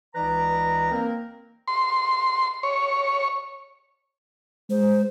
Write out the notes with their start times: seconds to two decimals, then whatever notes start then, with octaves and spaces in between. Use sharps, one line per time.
0.15 C#2 E3 D#4 B4 D5 A#5
0.92 A#3 C4 A#4
1.68 C6
2.63 C#5
4.70 G#3 C5